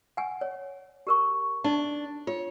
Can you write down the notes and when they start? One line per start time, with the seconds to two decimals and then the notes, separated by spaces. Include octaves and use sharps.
0.17 F#5 G#5
0.41 C#5
1.07 G4 A#4 C#6
1.64 D4 D#4 A5
2.27 F4 C#5